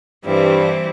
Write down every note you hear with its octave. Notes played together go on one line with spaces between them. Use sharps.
G2 E3 G3 C4 E4